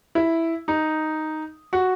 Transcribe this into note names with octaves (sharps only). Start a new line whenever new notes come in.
E4
D#4
F#4